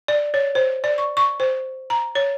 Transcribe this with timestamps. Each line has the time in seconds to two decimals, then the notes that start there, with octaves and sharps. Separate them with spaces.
0.08 D5
0.34 C#5
0.55 C5
0.84 D5
0.98 C#6
1.17 C#6
1.40 C5
1.90 A#5
2.15 C#5